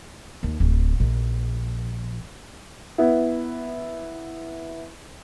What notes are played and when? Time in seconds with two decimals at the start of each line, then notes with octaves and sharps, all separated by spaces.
0.43 D#2
0.60 D1
1.00 A#1
2.98 B3 E4